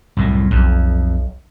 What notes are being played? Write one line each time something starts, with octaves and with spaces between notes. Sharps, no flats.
C2 F#2 A2
B1 F2